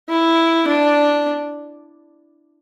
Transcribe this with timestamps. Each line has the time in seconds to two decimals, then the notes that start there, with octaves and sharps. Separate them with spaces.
0.09 E4
0.67 D4